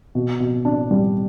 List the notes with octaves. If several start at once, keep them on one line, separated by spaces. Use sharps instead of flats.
B2
B2
D4
G3